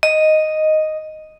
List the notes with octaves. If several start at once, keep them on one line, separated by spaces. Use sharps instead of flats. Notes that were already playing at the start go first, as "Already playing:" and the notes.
D#5